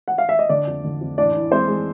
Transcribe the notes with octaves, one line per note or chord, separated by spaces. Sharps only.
F#5
F5
E5
D#5
D3 D4 D5
F2
D3
F2
A1 D4 D5
E3
G#3 C4 C5
G#3